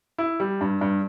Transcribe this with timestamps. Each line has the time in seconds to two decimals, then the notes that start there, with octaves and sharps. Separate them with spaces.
0.18 E4
0.40 G3
0.61 G2
0.81 G2